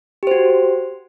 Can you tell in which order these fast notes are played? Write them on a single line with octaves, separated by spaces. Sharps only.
G4 C5 F#4